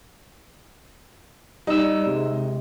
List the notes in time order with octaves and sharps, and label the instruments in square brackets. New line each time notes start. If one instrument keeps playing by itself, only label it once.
[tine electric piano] G3 E6 [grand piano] D#4
[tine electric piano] C3 G#3